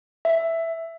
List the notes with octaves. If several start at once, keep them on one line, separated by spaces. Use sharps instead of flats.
E5